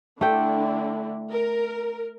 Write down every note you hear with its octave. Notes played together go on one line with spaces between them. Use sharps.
D3 A3 D4 E4 G5
A#4